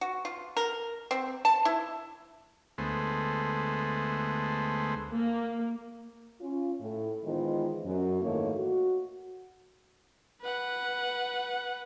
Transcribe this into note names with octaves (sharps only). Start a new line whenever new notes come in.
F#4
F4
A#4
C4
A5
E4
D2 G#3 A3 B3 C5
A#3
C#4 F4
A2
D#3 E3 G#3 B3 F4 C5
F#2
G#2 D#3 E3 A3 A#3 C#5
F#4
B4 F#5